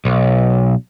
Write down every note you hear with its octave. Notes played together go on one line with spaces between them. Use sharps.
B1